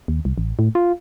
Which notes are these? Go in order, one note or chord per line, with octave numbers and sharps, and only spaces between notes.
D#2
C2
A1
A2
F4